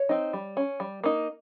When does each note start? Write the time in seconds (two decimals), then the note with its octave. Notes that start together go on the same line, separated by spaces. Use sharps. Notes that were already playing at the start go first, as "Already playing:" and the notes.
Already playing: C#5
0.09 C4 D#4
0.33 G3
0.57 C#4
0.80 G3
1.03 A#3 D#4